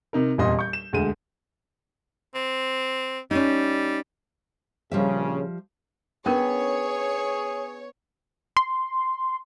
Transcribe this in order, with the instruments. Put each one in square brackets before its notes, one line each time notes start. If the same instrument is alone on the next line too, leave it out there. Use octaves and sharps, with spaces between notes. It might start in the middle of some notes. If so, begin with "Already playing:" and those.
[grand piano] C3 D#4 A#4
D#1 E2 A#2 D#5 C6
C#6 G6
E7
E1 D2 G#3 D#7
[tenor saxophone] C4
[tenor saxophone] G3 [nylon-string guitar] C#4 D#4
[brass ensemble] A#1 C#3 [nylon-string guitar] F3 G3 E5
[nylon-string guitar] B3 [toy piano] C#4 D4 A#4 [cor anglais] G#4 [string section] C#5
[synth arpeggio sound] C6